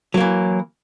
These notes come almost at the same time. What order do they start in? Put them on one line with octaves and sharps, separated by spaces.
F#3 A#3 E3